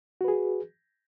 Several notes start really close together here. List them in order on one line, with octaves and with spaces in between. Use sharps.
F#4 B4 G#4